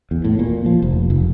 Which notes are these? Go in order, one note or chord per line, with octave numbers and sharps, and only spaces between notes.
E2
A2
A#2
F3
F1
F1